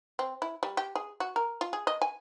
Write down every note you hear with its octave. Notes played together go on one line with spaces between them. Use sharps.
C4
E4
G3
G4
G#4
F#4
A#4
F4
G#4
D#5
G#5